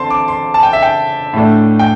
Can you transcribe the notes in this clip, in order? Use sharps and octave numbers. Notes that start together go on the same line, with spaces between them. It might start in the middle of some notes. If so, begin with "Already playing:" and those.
Already playing: D3 C4 A5 C6
D6
C6
A5
G5
E5
G5
A2 A3 D4
G5